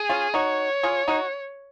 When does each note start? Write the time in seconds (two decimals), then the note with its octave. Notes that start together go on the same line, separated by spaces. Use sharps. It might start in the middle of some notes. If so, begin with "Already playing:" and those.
Already playing: G#4
0.10 C#4 F4
0.34 D#4 F#4 C#5
0.83 F4 G#4
1.08 D#4 F#4